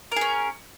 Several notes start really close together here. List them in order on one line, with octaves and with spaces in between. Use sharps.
A#4 G#4 C#4